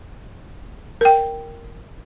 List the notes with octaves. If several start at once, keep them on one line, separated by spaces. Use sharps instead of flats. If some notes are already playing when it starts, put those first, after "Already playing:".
A#4 G5